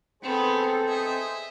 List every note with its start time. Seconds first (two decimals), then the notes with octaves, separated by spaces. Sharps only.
0.23 B3 C4 G#4 A4 C5
0.88 D#5 E5